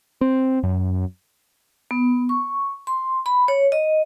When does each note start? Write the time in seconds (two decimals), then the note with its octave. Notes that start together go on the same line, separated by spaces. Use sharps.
0.21 C4
0.63 F#2
1.91 B3
2.29 C#6
2.87 C6
3.26 B5
3.48 C#5
3.72 D#5